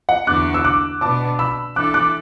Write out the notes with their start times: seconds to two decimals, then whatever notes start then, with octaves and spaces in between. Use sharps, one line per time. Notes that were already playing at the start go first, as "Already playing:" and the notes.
0.09 F#5
0.27 E2 D3 B3 D4 F#4 D6 F#6
0.54 E6
0.64 D6 F#6
1.01 B2 B3 D4 A5 D6
1.39 B5 E6
1.76 E3 D4 A4 D6 F#6
1.94 D6 F#6